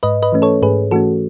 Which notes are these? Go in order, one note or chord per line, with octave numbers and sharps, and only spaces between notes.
G#2 B4 D#5
B4 D#5
E3 A3 C#4
A4 C#5
G#2 G#4 B4
E3 A3 C#4 F#4 A4